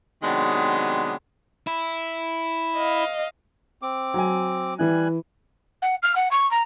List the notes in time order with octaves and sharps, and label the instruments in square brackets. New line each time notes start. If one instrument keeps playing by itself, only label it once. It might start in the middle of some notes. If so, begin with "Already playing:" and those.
[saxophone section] C3 D#3 F#3 G#3 B3 D4
[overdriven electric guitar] E4
[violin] D#5 F5
[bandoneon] C4 D6
[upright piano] F#3 G#5
[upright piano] E3 E4 [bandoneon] G3 G#5 F#6
[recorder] F#5
F6
F#5
C#6
A#5